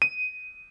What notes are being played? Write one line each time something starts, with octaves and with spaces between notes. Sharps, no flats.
D#7